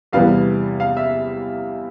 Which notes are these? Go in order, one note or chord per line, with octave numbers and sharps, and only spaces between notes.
E2 C3 E3 G3 B3 F5
F5
E5